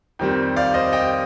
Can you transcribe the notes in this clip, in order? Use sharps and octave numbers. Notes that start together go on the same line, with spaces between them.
F2 D#3 G3 C4
D5 F5
C5 D#5
D#5 G5